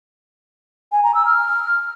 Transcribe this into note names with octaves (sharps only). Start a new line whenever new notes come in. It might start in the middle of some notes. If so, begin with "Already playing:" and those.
G#5
A#5
E6
F6